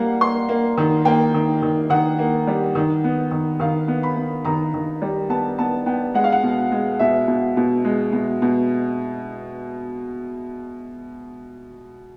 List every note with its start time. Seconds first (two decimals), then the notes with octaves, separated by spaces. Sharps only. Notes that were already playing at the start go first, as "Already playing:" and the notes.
Already playing: G3 A#3 F5 F#5
0.21 A#3 C6
0.49 A#3
0.78 D#3
1.05 A#3 G5
1.34 D#3
1.62 D#3
1.90 D#3 F#5
2.19 A#3
2.47 G3
2.75 D#3
3.04 B3
3.31 D#3
3.60 D#3 F5
3.88 B3
4.03 B5
4.16 B3
4.45 D#3 A#5
4.74 D#3
5.02 G3
5.29 B3 A5
5.59 B3 A5
5.86 B3 G5
6.14 G#3 F#5
6.24 F5
6.32 F#5
6.43 B2
6.72 G#3
6.99 B2 E5
7.28 B2
7.57 B2
7.85 G#3
8.13 B2
8.42 B2